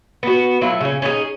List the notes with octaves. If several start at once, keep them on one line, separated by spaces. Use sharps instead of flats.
B3 F#4
F#3 A3 E4 F4
C#3 C#4
C#4 D#4 E4 G#4